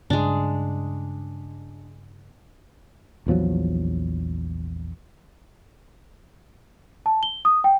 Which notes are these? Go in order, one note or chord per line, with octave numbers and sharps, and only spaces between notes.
G2 C#3 G#3 D4
A#1 E2 F3 F#3
A5
G7
D#6
G5